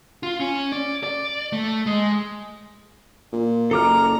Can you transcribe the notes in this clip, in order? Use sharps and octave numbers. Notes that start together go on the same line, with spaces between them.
F4
C#4
D5
D5
A3
G#3
A#2
F#1 A4 A#5 D6 F6